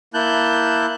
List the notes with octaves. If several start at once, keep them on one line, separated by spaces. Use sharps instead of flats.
A#3 E4 A5 F#6 G6